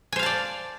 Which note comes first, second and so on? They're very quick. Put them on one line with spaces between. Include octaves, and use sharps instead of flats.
G#5 C5 F5 A5 D5